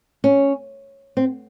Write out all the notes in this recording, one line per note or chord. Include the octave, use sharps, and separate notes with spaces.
C#4
C4